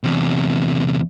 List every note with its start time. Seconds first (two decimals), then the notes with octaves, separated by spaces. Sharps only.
0.04 E2 C3